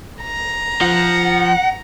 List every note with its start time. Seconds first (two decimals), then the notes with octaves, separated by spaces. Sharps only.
0.22 A#5
0.81 F3 F#5